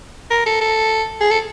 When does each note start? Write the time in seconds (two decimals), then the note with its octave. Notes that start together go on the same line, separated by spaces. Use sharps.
0.30 A#4
0.46 A4
0.61 A4
1.20 G#4
1.31 A4